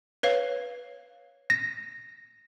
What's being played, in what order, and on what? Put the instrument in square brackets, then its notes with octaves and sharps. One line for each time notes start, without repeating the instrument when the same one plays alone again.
[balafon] B4 C#5 F5
[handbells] A#6